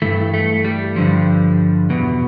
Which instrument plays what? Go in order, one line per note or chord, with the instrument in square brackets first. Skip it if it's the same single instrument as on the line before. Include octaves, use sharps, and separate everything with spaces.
[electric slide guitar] G2 E3 A3
A3
G3
G2 D3 F3
E2 B2